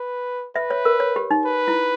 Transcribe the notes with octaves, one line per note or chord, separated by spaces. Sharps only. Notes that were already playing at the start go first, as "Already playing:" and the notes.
Already playing: B4
B4 E5
C#5
A#4
C#5
G4
D#4
B4
E4